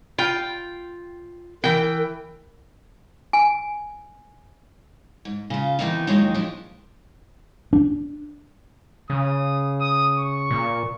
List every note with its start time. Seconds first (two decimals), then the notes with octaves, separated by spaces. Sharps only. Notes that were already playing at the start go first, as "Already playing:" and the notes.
0.18 F4 G5
1.64 E3 A#4 G5
3.33 G#5
5.25 G#2
5.50 C#3 F4
5.79 D#3 E3 A3 B3 C4 D#4
6.07 D#2 D#3 F3 F#3 G#3 D#4
6.34 F3 D4
7.73 D4
9.10 C#3 D#6
9.80 D#6
10.18 C#6
10.51 A#2